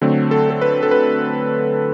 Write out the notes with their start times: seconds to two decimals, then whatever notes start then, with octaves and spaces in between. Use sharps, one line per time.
0.02 D3 F#3 A3 C4
0.31 A4
0.50 A4
0.61 B4
0.83 A4
0.91 B4